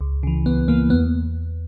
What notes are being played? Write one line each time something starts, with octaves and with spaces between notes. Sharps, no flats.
C#2
C#3 E3
C#2 B3
C#3 E3 A#3
E2 B3